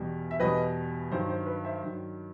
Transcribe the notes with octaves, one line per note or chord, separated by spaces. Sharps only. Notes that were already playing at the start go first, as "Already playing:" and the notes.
Already playing: E2 B2 G3
E5
E2 B2 G3 B4 D#5
G2 D#3 F#3 C5
C5
B4
C5 E5
G2 D#3 F#3